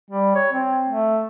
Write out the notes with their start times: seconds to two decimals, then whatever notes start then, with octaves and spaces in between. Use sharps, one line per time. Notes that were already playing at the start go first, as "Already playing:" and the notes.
0.10 G3
0.35 C#5
0.52 C4
0.88 A3